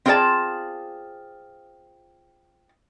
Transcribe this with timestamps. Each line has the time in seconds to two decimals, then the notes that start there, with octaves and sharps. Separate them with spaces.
0.06 C4 F4 G#4 A#4 D5 A5